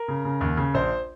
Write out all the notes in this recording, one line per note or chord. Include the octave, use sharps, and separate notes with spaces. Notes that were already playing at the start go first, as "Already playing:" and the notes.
Already playing: A#4
C#3
C#3
D#2
C#3
A#1 C5